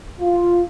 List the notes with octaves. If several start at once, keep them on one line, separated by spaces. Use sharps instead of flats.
F4